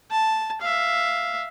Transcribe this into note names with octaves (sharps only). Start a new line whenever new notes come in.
A5
E5 F5